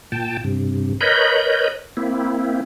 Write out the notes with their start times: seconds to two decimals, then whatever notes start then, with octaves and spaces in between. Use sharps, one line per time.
0.12 A#2 G5 A5
0.44 G2 C3
1.01 A#4 B4 C#5 D#5 B5 G6
1.97 A#3 C4 E4